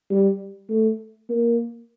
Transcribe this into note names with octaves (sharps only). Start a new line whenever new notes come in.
G3
A3
A#3